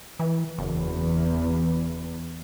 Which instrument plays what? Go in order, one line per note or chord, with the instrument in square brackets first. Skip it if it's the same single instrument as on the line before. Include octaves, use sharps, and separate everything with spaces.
[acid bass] E3
[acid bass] F#1 [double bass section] E2